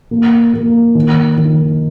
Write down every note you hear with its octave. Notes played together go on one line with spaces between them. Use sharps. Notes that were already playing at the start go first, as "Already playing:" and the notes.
A#3
A#3
D#3
D#3